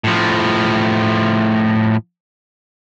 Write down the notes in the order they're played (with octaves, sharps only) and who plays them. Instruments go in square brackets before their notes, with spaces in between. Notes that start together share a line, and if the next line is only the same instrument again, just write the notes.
[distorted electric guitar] A2 F3